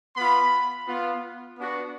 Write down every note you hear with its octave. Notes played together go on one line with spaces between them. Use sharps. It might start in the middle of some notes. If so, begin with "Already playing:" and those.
B3 F4 B5
B3 F4
B3 D4 F#4